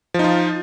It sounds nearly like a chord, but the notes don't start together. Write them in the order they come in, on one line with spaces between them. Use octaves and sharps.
F3 D#4 F4